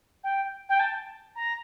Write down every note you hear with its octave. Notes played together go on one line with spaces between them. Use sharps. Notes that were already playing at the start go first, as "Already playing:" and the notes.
G5
G5
A5
A#5